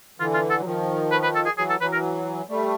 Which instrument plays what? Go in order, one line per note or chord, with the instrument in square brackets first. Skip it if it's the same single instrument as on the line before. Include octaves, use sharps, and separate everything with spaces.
[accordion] D3 E3 [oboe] F4
[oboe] F4
A4
[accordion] F#3
D#3 F3
[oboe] B4
B4
A4
G#4
[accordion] E3 F#3 [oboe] G#4
[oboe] A4
[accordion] E3 F#3 [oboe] B4
[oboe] A#4
[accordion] G3 A3